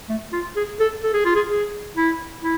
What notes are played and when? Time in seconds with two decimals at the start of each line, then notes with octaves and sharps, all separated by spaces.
0.09 A3
0.33 F4
0.56 G#4
0.80 A4
1.03 A4
1.13 G#4
1.25 F4
1.35 G#4
1.49 G#4
1.96 E4
2.43 E4